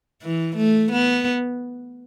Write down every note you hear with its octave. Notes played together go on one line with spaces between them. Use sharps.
E3
A3
B3